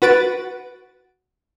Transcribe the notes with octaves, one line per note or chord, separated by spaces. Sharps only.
F#4 B4 A6 D7